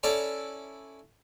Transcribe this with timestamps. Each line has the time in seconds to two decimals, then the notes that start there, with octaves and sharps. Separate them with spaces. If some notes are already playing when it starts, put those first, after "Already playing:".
0.03 C#4 E4 A4 D5 A5 A#5